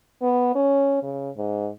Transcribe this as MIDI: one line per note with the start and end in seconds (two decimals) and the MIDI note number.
0.22 0.51 59
0.55 0.99 61
1.03 1.30 49
1.36 1.69 44